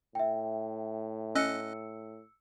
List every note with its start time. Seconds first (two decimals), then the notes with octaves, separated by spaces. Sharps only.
0.15 A2 E5 G5
1.35 C#4 D#5 E6 F#6 C#7